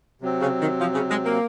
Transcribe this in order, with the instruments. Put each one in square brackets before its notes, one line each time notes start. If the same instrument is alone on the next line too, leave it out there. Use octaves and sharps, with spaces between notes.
[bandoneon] C3 F#3 C4
[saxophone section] C#3
D#3
F3
C#3
G#3
A#3